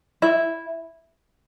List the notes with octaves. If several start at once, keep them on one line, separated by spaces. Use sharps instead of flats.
E4 E5